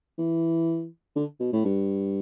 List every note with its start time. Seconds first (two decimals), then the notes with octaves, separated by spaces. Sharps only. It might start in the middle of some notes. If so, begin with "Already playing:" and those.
0.18 E3
1.16 D3
1.40 B2
1.53 A2
1.65 G2